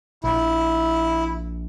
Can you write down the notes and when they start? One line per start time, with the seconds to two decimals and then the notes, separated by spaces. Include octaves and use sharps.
0.24 A#1 E4